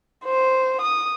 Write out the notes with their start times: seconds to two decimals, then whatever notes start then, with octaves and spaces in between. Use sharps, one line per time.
0.25 C5
0.82 D#6